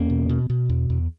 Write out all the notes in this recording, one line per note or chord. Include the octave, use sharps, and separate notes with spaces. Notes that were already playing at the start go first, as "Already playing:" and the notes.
Already playing: E2 A#3 C#4
B2
B2
B2
E2
E2